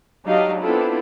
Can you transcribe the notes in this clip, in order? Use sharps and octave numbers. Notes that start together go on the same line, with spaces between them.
F#3 D4 D#4 G4 D#5 F5
B3 C4 D4 E4 F4 A4